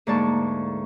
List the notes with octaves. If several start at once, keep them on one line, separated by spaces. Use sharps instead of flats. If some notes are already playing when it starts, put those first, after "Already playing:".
D2 G#2 A#3 D5 A5 C#6